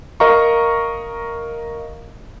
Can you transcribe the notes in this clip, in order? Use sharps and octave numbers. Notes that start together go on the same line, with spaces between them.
A#4 D#5 F5 A#5 C#6